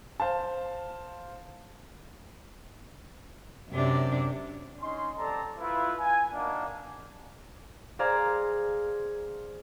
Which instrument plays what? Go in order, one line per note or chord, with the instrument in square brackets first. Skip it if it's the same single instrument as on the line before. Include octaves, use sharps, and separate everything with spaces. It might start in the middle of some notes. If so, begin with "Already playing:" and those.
[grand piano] C5 F5 A5
[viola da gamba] F#2 C3 D4
[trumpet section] C#4 D#4 C6
G3 C4 A4 D5 A5 A#5
E4 F4 B4
G#5
A#3 D4 D#4 F#4 A#4 F5
[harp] G#4 C5 D5 F5 A#5 G#6